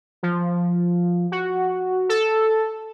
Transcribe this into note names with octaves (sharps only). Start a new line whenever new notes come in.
F3
F#4
A4